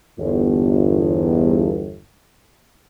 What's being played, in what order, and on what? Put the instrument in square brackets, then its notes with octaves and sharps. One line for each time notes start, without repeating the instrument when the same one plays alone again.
[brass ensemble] G1 E2